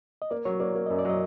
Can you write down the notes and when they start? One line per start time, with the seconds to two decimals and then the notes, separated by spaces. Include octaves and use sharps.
0.22 D#5
0.31 A#3 D5
0.45 F#3 C#5
0.60 A#3 D5
0.75 A#3
0.86 F#2 D#5
0.99 D5
1.05 F#3 D#5